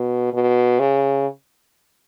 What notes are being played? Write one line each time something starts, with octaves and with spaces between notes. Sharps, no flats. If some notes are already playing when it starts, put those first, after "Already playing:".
Already playing: B2
B2
C#3